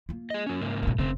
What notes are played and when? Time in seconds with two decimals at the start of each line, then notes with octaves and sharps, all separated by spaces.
0.09 A#3 F4
0.30 G#4 D#5
0.47 F#3 C#4
0.61 G#2 C#3 A#3
0.83 B2 D3
0.99 F1 C#3 A3 C4